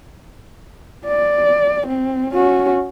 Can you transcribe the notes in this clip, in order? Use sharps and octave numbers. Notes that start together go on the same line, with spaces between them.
D5
C4
C#4 F#4